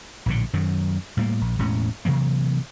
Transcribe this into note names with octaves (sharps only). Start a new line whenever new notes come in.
A#1 A2 D3
F#2 D#3 F#3
A2 G3 G#3 A#3
A#1
E1 A2 G#3 C#4
C3 E3 F#3 A#3